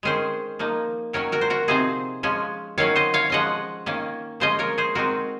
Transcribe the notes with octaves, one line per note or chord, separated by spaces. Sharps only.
D#3 G#3 C#4 G#4 C5
F3 A#3 D#4
D#3 F#3 C#4 A#4 C#5
F#4 A#4
C5
F#4 A#4
C3 F3 C4 D#4 G#4 C5
F3 G#3 C#4
D#3 F#3 C#4 C#5 F5
C5 D#5
C#5 F5
F3 G#3 C#4 D#5 F#5
D#3 A#3 C#4
F3 G#3 C#4 C5 D#5
A#4 C#5
G#4 C5
D#3 G#3 C4 D#4 F#4 A#4